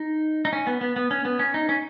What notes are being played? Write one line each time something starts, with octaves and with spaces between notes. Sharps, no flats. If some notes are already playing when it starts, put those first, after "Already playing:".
Already playing: D#4
D#4
C#4
B3
B3
B3
C#4
B3
C#4
D#4
C#4